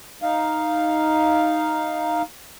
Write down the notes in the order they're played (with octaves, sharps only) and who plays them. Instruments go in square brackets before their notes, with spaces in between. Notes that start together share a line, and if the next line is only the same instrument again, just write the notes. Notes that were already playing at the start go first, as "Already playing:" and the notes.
[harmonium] D#4 F5